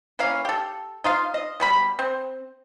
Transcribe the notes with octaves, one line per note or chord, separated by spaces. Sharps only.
E3 A#3 C#4 F5
G4 A4
D#4 F4 F5
D#5
B2 G3 B5
C4